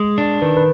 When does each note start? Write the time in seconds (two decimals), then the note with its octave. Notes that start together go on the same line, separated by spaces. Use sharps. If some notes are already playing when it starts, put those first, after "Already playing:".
Already playing: G#3
0.18 D4
0.42 D#3 B4
0.57 B4